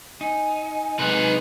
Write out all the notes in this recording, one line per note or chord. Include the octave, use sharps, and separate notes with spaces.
D#4 G#5
C3 G#3 D#4 B4